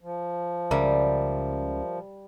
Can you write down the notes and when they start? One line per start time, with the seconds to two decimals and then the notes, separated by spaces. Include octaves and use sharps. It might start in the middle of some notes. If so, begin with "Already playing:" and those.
0.01 F3
0.71 C#2 C#3 G3 A#4 D5 E5